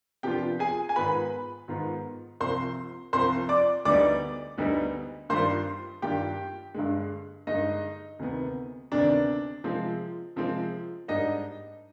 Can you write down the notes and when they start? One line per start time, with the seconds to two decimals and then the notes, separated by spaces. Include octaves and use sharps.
0.23 C3 F3 B3 D4 F4 G4 G5
0.59 G#4 G#5
0.89 G#5
0.96 G#2 D#3 B3 F4 B4 B5
1.68 G#2 D#3 B3 F4
2.41 C2 C3 F3 C5 C6
3.13 C2 C3 F3 C5 C6
3.49 D5 D6
3.85 D2 D3 G3 B3 D#4 D5 D6
4.57 D2 D3 G3 B3 D#4
5.29 G2 D#3 G3 D4 F4 C5 C6
6.02 G2 D#3 G3 D4 F4 G4 G5
6.74 G2 D3 G#3
7.47 G2 D3 G#3 D#4 D#5
8.19 D2 C3 D#3 B3
8.92 D2 C3 D#3 B3 D4 D5
9.64 C3 F3 G#3 C4
10.36 C3 F3 G#3 C4
11.08 G#2 G3 D4 D#4 D#5